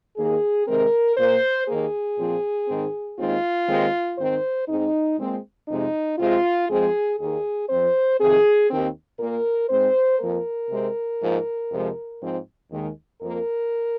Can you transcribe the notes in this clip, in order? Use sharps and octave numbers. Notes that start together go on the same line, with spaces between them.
D#2 D#3 A#3 G#4
C3 D#3 G#3 C4 A#4
A#2 A#3 C5
D#2 D#3 A#3 G#4
A#2 F3 C4
G#2 D#3 C4
D#2 D#3 G#3 C4 F4
D#2 D#3 G#3 C4
G#2 D#3 C4 C5
G#2 G#3 C4 D#4
A#2 G#3 C4
F2 C3 G#3 D#4
C3 G#3 C4 F4
F2 F3 G#3 C4 G#4
D#2 D#3 A#3 G#4
F2 F3 C4 C5
F2 C3 D#3 C4 G#4
D#2 D#3 C4
A#2 A#3 A#4
G#2 G#3 C4 C5
F2 F3 A#3 A#4
C3 G#3 C4
G#2 F3 A#3
F2 C3 F3 G#3
G#2 F3 C4
D#2 D#3 G#3
F2 F3 A#3 A#4